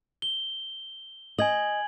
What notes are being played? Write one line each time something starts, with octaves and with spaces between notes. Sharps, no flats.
G7
D#5 G#5 G#6 F#7